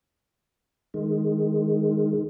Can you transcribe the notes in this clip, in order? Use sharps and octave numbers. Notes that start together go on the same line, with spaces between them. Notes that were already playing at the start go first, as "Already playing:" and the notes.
D#3 G#3